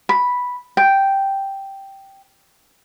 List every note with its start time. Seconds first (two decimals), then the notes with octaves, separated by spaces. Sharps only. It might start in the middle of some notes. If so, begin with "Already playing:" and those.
0.09 B5
0.77 G5